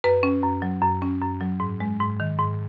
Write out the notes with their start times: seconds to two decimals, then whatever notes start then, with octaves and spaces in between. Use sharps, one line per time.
0.04 F#2 B4
0.23 C#4
0.43 F#2
0.62 F#3
0.82 F#2
1.02 C#4
1.22 F#2
1.41 F#3
1.60 G#2
1.80 G#3
2.00 G#2
2.20 D#3
2.39 G#2